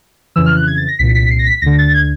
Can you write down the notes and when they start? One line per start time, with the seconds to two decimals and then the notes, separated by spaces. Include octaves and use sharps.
0.36 F2 C#3 E3 E6
0.46 F6
0.57 F#6
0.67 G#6
0.77 A6
0.88 A#6
0.99 C2 A#2 B6
1.15 B6
1.31 C7
1.39 A#6
1.46 B6
1.62 D2 D3 A#6
1.78 A6
1.94 G#6